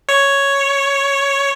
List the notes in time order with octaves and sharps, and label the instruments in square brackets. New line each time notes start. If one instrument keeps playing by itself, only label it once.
[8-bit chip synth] C#5